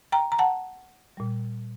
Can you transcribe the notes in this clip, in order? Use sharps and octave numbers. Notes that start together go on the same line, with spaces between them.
G5 A#5
A#5
F#5 A5
A#2 G3